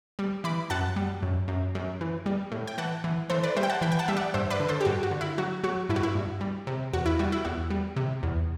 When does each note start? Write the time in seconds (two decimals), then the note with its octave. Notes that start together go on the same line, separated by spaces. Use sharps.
0.19 G3
0.44 E3 B5 D6
0.70 F#2 F#5 A5
0.96 G3
1.22 F#2
1.48 F#2
1.75 F#2
2.01 E3
2.26 G3
2.52 A2
2.67 G5
2.78 E3 F#5 A5
3.04 E3
3.30 E3 A4 C5
3.43 B4 D5
3.57 G3 C5 E5
3.63 G5
3.70 F#5 A5
3.81 E3 G5 B5
3.92 G5
3.99 F#5 A5
4.08 G3 E5
4.17 D5 F#5
4.34 G2 C5 E5
4.51 B4 D5
4.60 D3
4.69 A4 C5
4.81 G4
4.85 G2 F#4
5.03 F#4
5.11 D3
5.21 E4
5.38 F#3 F#4
5.63 F#3 F#4
5.89 G2 E4
5.96 F#4
6.03 E4
6.15 G2
6.41 G3
6.67 C3
6.93 E2 F#4
7.06 E4
7.19 G3 F#4
7.32 E4
7.45 E2 F#4
7.70 G3
7.96 C3
8.23 E2